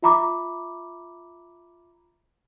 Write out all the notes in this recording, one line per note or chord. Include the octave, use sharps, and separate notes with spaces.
F4 E5 A#5 B5 D6